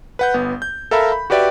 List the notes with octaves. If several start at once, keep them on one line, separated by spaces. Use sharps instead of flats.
B4 F#5 G6
G1 B3
G6
A4 A#4 E5 F5 A#5 B5
B5
F#4 G4 B4 D5 E5 G5